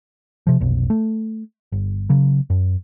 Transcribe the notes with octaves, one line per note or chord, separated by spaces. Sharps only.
C3 F3
F1 B1
A3
G1
C#3 F#3
F#2